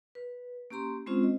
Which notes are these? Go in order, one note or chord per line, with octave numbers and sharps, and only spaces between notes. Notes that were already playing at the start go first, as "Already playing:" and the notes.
B4
A#3 C#4 G4 A#5 C6
G#3 C4 C#4 F4 C5
D#5